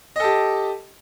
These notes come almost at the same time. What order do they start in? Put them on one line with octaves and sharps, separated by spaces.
D#5 A4 G4